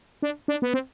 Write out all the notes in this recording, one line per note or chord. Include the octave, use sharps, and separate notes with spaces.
D4
D4
B3
C4